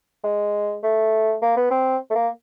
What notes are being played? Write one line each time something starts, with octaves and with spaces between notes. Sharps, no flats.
G#3
A3
A#3
B3
C4
A3
A#3